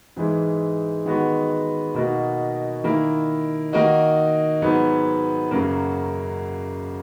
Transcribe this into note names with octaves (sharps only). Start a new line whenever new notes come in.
G#2 E3 G#3
D#3 G#3 B3 F#4
B2 A#3 D#4 F#4
D#3 A#3 E4
D#3 A#3 D#4 F#4
G#2 F#3 B3
F#2 C#3 F#3 A#3